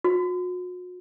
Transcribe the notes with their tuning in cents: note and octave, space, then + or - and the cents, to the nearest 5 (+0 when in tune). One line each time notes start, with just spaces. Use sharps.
F#4 -40